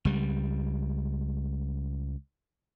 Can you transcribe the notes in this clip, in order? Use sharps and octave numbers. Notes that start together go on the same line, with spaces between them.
C#2 G3